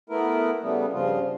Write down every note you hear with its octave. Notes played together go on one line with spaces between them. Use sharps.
A3 B3 E4 A#4
C#3 G3 A3 B3
G2 C#3 F3 F4